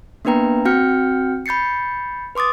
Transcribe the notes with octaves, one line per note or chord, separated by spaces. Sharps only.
A#3 B3 D4 B4 G5 A#5
C4 F#4 G5 F6 G6 C#7
B5 G6 A6 C7 C#7
B4 C6 D6 D#6 A6